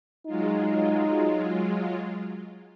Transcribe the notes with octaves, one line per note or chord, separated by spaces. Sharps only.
F#3 G#3 D#4 F4